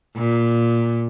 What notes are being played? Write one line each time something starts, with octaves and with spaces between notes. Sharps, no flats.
A#2